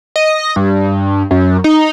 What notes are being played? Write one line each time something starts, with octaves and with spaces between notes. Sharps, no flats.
D#5
G2
F#2
D#4